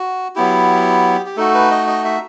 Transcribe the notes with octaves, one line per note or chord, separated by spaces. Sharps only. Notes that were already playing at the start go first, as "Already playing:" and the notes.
Already playing: F#4
F#3 B3 E4 G4
G4
A3 D#4 F#4 A4
B4
D#5
D#5
E5